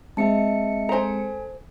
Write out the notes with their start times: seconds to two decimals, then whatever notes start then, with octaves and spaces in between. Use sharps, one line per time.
0.17 G#3 C4 D#5 E5 A5 C#7
0.89 A4 C5 G#5 A#5